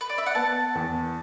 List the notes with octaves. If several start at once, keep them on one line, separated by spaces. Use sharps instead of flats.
B4
D5
E5
F#5
B3 A5
E2